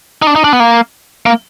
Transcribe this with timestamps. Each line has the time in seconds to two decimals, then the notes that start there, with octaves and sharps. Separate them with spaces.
0.22 D#4
0.27 D4
0.36 D#4
0.44 D4
0.53 B3
0.60 A#3
1.26 A#3